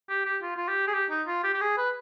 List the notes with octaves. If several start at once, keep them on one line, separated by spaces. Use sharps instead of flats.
G4
G4
F4
F4
G4
G#4
G4
D#4
F4
G4
G4
G#4
B4